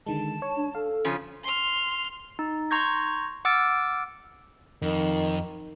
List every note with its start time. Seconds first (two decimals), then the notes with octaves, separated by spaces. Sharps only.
0.06 D3 D#3 G#3 A5
0.42 C#5
0.57 D4
0.75 A4 F5
1.05 C#3 F3 C#4 G#5
1.44 C6 F6
2.39 D#4
2.71 A#5 C6 C#6 G6 G#6 A#6
3.45 F#5 D6 E6 F6 A6 D7
4.82 F2 D#3